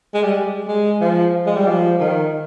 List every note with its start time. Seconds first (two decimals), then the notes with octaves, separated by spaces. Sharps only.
0.14 G#3
0.24 G3
0.68 G#3
1.01 F3
1.46 G#3
1.57 G3
1.67 F3
2.00 D#3